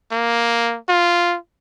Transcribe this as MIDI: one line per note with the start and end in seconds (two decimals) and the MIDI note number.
0.12 0.77 58
0.89 1.37 65